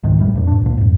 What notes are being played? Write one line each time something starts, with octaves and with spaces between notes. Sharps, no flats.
C#2 G#2 D#3
A#1 F#2 A2 G3
F2 A#2
G#2 D4
C#2 A#2
F2 G#2